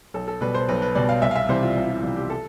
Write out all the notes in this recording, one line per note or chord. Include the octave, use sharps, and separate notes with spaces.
B1 A4
A4
B2 G3 B4
C5
B1 B4
B4
B2 G3 D5
F5
C2 E5
F5
E5
C3 E3 G3 C5
F4
C2 F4
E4
F4
C3 E3 G3 F4
G4
A4